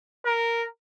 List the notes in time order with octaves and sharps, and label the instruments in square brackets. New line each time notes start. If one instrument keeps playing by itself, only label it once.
[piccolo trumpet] A#4